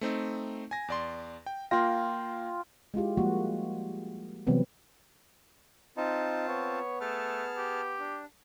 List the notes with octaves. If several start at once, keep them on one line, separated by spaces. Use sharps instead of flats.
A3 C4 D#4
G#5 A#6
E2 D5 C6
G5
A#3 F4 G5 A#6
G#3 E4 F4 G4
F3 G3 G#3 A#3 F#4
C3 E3 F#3 G3 B3 C4
C4 D#4 F4 A5
B3 C#5
A3 G#4 A5 F6
G4
D4